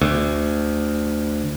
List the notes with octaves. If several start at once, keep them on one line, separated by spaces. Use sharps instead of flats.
D2